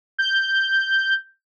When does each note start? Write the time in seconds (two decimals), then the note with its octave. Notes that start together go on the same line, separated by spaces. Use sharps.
0.18 G6